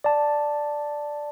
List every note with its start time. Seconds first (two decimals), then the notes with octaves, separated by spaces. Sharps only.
0.04 D5 A5